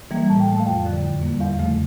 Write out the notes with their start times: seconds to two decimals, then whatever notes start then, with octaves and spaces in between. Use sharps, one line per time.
0.11 E3 G3 A#3
0.29 A2 A5
0.40 G5
0.48 F3 A3 A5
0.60 F5
0.66 F2 G5
0.85 D3 F3
1.03 E2
1.22 D3 G3 A#3
1.40 E2 F5
1.59 C#3 F3 A3